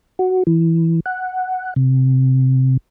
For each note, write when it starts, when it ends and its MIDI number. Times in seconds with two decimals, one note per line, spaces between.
0.19 0.43 66
0.47 1.00 52
1.06 1.74 78
1.76 2.77 48